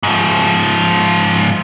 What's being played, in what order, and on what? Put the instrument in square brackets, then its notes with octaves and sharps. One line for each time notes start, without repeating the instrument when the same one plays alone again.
[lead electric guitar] G#2 F3